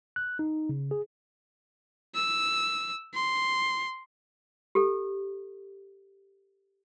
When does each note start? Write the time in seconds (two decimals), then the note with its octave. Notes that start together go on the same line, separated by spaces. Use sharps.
0.16 F#6
0.39 D#4
0.69 C#3
0.91 G#4
2.15 E6
3.14 C6
4.75 G4 A4